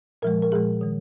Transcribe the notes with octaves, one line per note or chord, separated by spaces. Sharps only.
A#2 F3 G#3 A#4
A#4
A#2 F3 G#3 G#4
D#3 G#3